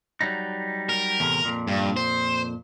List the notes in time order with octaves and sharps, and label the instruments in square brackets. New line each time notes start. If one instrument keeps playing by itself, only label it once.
[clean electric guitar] F#3 G3 D#4
[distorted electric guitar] A#4
[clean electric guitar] E2 A2 C3
F2 A#2
[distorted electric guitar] G2
C5